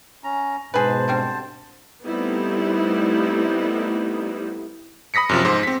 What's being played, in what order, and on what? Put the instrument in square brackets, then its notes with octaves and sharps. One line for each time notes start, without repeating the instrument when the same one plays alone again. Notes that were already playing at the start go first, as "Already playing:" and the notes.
[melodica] C#4 A#5
[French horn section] G#2 B2 [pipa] G#4 B4 [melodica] C5 A5
[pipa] D3 G3 C4
[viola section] G3 A3 B3 C4 D#4 E4
[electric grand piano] B5 D#6 A#6 B6 C#7
F#2 C3 F3
G#2 C5
C4 B6